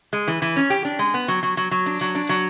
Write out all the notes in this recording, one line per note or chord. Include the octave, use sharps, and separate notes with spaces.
G#3
E3
E3
C#4
G4
D4
G#3
B3
F#3
F#3
F#3
F#3
D4
F#3
D4
F#3